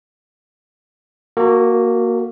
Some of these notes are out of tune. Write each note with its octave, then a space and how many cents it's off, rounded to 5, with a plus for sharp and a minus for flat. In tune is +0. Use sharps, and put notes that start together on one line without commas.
A#3 +0 F#4 +0 A4 +45